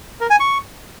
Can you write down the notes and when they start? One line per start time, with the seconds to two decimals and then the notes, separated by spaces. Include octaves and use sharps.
0.21 A#4
0.30 G#5
0.40 C#6